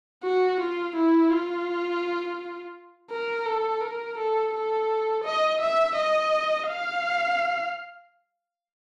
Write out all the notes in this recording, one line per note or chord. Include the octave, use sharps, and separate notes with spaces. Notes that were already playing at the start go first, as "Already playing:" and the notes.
F#4
F4
E4
F4
A#4
A4
A#4
A4
A4
D#5
E5
D#5
F5